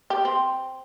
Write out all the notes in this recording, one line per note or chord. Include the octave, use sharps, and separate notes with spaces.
G4
C4